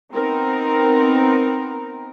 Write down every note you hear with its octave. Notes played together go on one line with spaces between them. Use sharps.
B3 C4 D#4 A#4